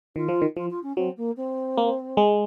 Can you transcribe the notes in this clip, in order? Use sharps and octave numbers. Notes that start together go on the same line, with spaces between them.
D#3 F4
F3
D#3
F3 F4
F4
C#4
F#3 C4
A#3
C4
A#3
G#3